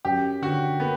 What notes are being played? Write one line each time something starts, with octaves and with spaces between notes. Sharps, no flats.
F#2 G4
D3 F#4
A#3 B3